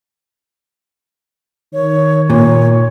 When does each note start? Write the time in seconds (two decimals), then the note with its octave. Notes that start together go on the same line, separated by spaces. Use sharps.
1.73 D#3 C#5
2.30 A#2 C#5